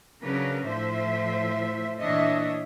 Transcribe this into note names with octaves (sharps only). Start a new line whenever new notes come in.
C#3 F#3 D4 A#4 B4
A2 F3 C5 E5
A#2 E3 D4 C#5 D#5 E5